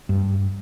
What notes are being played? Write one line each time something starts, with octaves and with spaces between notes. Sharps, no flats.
G2